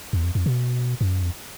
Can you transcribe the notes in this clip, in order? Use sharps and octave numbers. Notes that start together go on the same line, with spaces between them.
E2
F2
F2
B2
F#2
F2